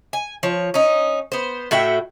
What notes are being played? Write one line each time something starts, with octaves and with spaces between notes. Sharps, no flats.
G#5
F3 C#5
C#4 D#4
B3 C5
A2 F#4 E5 G5